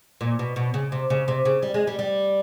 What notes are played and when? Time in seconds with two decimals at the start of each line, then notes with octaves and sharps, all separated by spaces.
0.21 A#2
0.39 B2
0.56 B2
0.74 C#3
0.92 C3
1.10 C#3
1.28 C3
1.45 C#3
1.62 G3
1.74 G#3
1.87 G3
1.99 G3